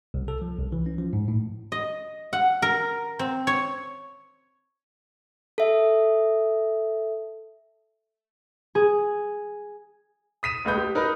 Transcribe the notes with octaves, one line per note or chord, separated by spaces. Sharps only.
C2
A4
F3
C2
E3
C#4
F3
G#2
A2
D#5
F#5
A#4
C4
C#5
A4 E5
G#4
D#6 B6 D#7 E7
F#1 C#2 A3 B4 D#6 G6
G4
D#4 A#4 B4